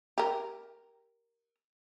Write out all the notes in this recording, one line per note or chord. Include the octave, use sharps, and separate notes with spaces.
G4 A#4